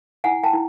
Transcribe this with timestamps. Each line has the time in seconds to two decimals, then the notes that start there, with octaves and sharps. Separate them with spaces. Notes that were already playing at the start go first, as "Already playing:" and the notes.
0.24 E4 F#5 G#5
0.43 G5 A5
0.53 E4